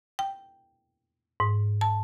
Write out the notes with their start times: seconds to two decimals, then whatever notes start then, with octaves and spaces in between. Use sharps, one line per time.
0.19 G5
1.40 G#2
1.81 A5